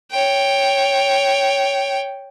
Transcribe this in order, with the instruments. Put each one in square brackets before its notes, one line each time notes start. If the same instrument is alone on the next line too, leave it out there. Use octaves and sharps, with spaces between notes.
[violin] C#5 G5